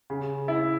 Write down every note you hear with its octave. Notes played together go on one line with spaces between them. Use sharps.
C#3
E4